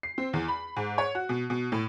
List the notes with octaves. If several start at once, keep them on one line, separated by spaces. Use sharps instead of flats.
C7
C4
E2
B5
G#2
C#5
F#4
B2
B2
A2